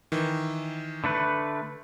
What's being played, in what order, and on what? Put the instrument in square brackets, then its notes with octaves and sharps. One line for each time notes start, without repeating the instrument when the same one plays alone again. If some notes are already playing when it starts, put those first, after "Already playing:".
[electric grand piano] D#3 E3
[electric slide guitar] D3 A3 B4